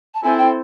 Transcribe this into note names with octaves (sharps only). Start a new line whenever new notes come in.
A5
C4 E4 A4 C5 G#5
G5